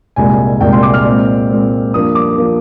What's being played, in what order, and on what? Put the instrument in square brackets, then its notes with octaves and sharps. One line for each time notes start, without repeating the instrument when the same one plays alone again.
[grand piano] C2 A#2 G#3 G#5
C2 A#2 G#3 G5
C6
D6
F6
A#2 G#3 C4
A#2 G#3 C4
G2 F3 A#3 D#6
D6
F3 A#3